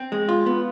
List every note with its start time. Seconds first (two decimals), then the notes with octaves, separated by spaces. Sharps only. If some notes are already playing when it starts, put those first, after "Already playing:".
Already playing: C4
0.12 G#3
0.29 F4
0.46 B3